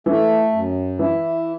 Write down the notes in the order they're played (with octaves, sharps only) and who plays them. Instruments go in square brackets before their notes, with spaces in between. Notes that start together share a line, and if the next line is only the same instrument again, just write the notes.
[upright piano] E3 [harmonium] A3
[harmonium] F#2
[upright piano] E3 [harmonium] E4